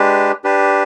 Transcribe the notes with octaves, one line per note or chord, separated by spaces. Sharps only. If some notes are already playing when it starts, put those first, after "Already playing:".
Already playing: G#3 D4 G4 B4
D4 G4 B4